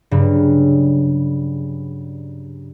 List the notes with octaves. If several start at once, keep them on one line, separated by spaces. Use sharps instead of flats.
G2 C#3 F#3